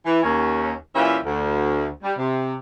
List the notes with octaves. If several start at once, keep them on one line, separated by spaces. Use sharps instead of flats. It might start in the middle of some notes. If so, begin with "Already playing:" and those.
E3
D#2 C#4
A#2 E3 C#4 F4 G4 E5
D2
G3
C3